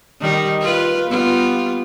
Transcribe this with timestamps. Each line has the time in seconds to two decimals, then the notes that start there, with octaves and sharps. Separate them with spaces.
0.20 D#3 G3 D#4
0.61 F4 B4
1.09 G3 B3 F4